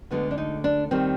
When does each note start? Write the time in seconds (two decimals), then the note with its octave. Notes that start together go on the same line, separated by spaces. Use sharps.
0.11 D2 D3 G#3 B3
0.31 D4
0.38 D#4
0.64 D4
0.91 D#2 D#3 G3 C4